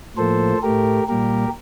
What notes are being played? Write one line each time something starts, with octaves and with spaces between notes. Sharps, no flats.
A2 F3 A#3 A4 C5
A2 A3 G4 A#4
A#2 G3 A#3 G4 A#4